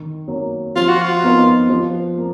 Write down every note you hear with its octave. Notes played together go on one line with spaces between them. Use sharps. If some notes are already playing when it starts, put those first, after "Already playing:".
Already playing: D#3
F#3 A#3
F3 F4
F#4
F4
B3 D#4 A#4 D#5
F3
A#3